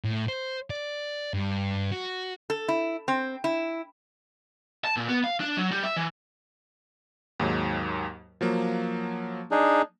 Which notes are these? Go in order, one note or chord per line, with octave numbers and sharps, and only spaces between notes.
A2
C5
D5
G2
F#4
A4
E4
C4
E4
A5
A#2
B3
F5
D4
F#3
G3
E5
E3
D#2 G#2 F#3
F3 F#3 A#3
D4 D#4 G#4